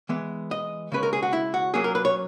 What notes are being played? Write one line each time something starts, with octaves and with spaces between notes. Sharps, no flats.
E3 G#3 B3
D#5
C#3 G#3 C#4 B4
A#4
G#4
F#4
E4
F#4
A#2 F#3 A#3 C#4 G#4
A#4
B4
C#5